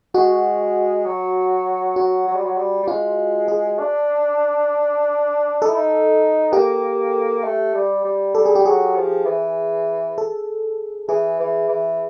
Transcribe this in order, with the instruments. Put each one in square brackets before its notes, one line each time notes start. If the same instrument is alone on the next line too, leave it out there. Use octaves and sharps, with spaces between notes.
[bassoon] G#3 [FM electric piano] F#4
[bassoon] F#3
[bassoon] F#3 [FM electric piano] F#4
[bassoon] F#3
G3
F#3
G3
G3
[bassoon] G#3 [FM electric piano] F4
[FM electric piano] G#4
[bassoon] D4
[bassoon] D#4 [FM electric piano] A4
[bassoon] E4
D#4
[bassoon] A#3 [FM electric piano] G4
[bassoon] A3
G3
G3
[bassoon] G3 [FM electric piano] A4
[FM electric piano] G#4
G4
[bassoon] F#3 [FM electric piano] G#4
[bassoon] F3
E3
[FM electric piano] A4
[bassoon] E3 [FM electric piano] G#4
[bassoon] E3
E3